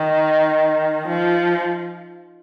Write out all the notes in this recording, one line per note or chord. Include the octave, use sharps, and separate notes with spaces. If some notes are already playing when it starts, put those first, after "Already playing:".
Already playing: D#3
F3